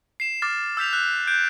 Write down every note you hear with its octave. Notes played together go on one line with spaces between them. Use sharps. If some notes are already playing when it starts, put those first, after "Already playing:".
C7 E7
D6 F6 A6
E6 G6 B6 F7
F#6
F#6 G6 D7